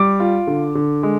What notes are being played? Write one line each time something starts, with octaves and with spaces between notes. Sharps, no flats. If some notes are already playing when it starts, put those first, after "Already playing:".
Already playing: G3 D6
F4
D3
D3
G#3